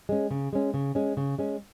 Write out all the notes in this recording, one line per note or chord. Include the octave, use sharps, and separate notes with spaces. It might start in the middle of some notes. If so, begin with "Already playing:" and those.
G#3 C#4
C#3
G#3 C#4
C#3
G#3 C#4
C#3
G#3 C#4